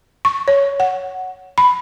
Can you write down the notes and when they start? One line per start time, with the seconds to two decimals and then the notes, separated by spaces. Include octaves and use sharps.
0.25 C#6
0.48 C#5
0.80 F#5
1.58 B5